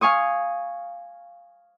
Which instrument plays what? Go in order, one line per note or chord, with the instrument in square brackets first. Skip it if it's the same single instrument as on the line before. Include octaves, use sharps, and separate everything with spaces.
[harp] F5 G#5 C#6 D#6